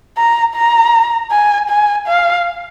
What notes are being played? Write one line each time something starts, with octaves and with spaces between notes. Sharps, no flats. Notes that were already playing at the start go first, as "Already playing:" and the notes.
A#5
A#5
G#5
G#5
F5